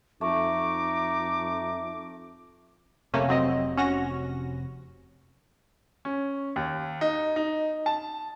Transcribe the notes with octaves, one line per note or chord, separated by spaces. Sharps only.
F2 A3 D#4 D6
F1 C3 A3 A#3 C#4
F#3 C4 D#5
C#4 F#4 A#6
C#4
D#2
D#4
D#4
A5